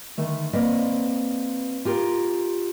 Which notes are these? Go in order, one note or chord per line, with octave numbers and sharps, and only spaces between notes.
D3 D#3 A3
A#3 C4 B4 D5 D#5
F4 G4 A#4